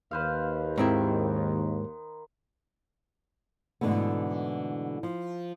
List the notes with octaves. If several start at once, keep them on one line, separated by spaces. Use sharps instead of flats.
D#2 B4 C5 F5
G#2 D#3 C4 E4
G#2 B2 D3 E3 A3 B3
F3